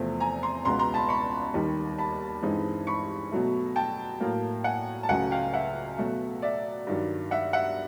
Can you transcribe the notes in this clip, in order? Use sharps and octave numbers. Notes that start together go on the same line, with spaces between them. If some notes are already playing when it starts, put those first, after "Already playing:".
Already playing: E2 C3 F3 A3 C4
G#5 A#5
A#5 C6
C#2 B2 G#3 B3 A#5 C6
A#5 C6
A5 B5
B5 C#6
D#2 D#3 G3
A5 B5
G2 E3 G#3 C4 D#4
B5 C#6
B2 F#3 A3
G5 A5
A2 F#3 A#3
F#5 G#5
A5
C#2 C#3 F#3 A3 F#5 G#5
F5 G5
E5 F#5
B2 F#3 A3
D5 E5
G2 D#3 F#3
E5 F#5
E5 F#5